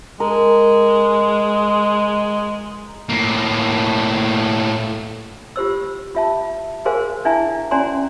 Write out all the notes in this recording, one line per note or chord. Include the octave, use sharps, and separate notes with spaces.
G#3 A#4
A2 A#3
F4 G4 C5 E6
F4 E5 A5
F#4 G#4 A#4 C5 F5 G#5
D4 E4 E5 G#5 A5
C#4 F#4 D5 G#5 A#5 C6